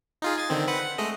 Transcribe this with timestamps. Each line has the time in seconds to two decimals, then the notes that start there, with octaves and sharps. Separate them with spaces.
0.22 D#4 F4 G#4
0.38 G#5 A6
0.50 D3 D#3 C4
0.68 C4 B4 F#5
0.80 F#5
0.98 G#3 A3 D#5